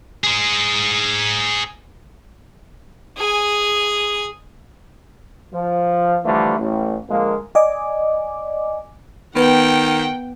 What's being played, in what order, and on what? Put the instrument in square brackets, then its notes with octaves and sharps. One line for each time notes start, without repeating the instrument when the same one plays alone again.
[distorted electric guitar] G#4 C5
[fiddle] G#4 G#5
[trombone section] F3
D3 E3 F3 G3 A3
A1
D3 F3 G#3 A#3
[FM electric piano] D5 D#5 G#5 D6
[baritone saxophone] D#3 [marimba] B3 B4 [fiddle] F#5 G5